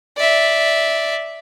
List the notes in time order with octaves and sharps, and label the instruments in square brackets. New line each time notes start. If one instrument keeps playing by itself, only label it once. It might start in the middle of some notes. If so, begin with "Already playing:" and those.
[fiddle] D5 E5